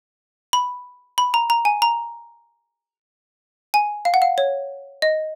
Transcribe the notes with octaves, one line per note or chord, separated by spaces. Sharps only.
B5
B5
A#5
A#5
G#5
A#5
G#5
F5
F#5
F5
C#5
D#5